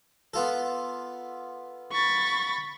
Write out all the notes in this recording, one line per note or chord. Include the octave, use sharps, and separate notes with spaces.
B3 F4 A4
B5 C#6 A6